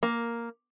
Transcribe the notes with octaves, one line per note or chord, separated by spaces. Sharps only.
A#3